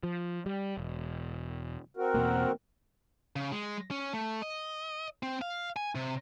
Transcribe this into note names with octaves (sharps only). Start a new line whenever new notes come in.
F3
G3
E1
C4 F#4 A#4
E2 B2 A#3
C#3
G#3
C#4
A3
D#5
C4
F5
G#5
C3